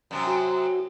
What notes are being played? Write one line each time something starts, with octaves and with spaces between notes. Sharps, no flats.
F#2 C3 F#3
F#4